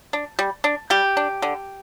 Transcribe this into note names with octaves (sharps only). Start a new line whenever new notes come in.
D4
G3
D4
G3 G4
D4
D3